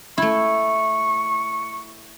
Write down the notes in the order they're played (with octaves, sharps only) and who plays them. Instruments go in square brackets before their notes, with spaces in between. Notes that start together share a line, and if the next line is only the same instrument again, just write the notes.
[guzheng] A3 E4 [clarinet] C#6